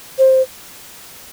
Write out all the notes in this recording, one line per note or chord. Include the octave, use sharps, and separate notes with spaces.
C5